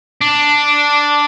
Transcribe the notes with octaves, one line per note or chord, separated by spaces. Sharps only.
D4